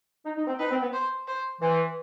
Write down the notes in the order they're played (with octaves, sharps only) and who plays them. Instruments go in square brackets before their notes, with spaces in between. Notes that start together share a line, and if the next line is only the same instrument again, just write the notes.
[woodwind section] D#4
D#4
C4
[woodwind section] D#4 [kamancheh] B4
[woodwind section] C4
B3
[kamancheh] C5
C5
[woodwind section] E3 [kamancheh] C5